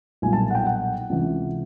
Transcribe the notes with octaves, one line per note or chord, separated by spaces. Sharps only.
B1 A#2 G3 G#5
A5
F#5
G5
F#5
C#2 C3 E3